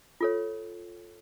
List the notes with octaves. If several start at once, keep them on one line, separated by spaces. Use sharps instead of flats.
F4 A4 C#5